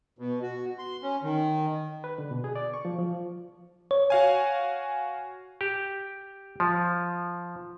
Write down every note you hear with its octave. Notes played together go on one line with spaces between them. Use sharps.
B2
F#4
C6
C#4
D#3
B4
D3
B2
G#4
D5
C#6
F3
F3
C#5
F#4 F5 G#5
G4
F3